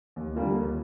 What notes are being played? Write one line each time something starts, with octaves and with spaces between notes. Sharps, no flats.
D#2
D3 G3 A#3 F4
D#2